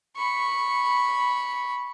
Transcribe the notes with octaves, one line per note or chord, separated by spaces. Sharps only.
B5 C#6